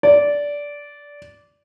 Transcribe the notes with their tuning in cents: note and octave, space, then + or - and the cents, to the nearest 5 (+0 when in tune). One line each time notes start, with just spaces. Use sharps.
D5 -15